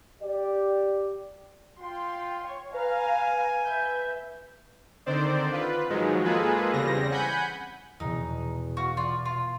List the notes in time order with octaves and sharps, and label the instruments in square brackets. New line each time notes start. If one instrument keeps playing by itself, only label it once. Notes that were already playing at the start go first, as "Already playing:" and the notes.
[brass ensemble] G4 D5
[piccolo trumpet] F4 [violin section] G5 C6
[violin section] C#5
[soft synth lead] B4 [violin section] F5 A#5 F6 [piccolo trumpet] G#5
[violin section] B4 E5 [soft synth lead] G6
[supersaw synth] D3 D#3 C4 C5 D5
F4 B4
G#2 D#3 F3 F#3 G#3
G#3 A#3 F4 G#4 A4 B4
E2 C#3 G3 C4 A#6
F#5 G#5 B5 G6
[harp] E2 B2 [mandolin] D#4
[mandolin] F#4 [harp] F5 C#6
[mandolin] F4 D5
[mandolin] F4 [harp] C7